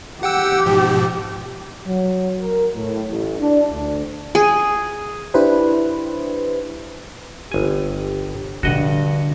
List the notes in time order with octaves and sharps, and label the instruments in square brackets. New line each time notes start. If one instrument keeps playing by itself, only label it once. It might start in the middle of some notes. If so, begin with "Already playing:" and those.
[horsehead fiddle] G4 [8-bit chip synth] F#5 G5 E6
[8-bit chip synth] G#2 B2 F3
[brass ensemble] F#3
A#4
A2
A1
D4
D2
[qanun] G#4
[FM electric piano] D4 E4 G4 B4 C5
[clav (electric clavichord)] G1 G#5 [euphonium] G4
[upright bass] A#1 D3 [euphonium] G2 [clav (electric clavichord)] F#4 D#5 F#5